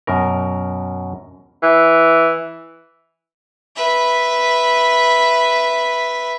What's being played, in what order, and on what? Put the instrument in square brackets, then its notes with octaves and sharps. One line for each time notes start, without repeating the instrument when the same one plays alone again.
[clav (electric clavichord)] F#2 B2 A#4
[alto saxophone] E3
[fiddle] B4 E5